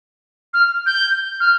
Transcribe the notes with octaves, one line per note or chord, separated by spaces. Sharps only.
F6
G6
F6